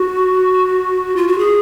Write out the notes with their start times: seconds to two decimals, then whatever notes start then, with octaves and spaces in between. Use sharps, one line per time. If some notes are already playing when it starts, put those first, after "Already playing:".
Already playing: F#4
1.16 F4
1.28 F#4
1.38 G#4